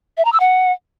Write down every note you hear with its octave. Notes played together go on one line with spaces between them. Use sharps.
E5
A#5
E6
F#5